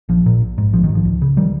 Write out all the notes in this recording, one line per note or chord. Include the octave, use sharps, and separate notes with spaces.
A#1 F3
A#2
A#1
G#2
A#1 F3
D#3
G#2
F3
C#2
C#3
D#3 G3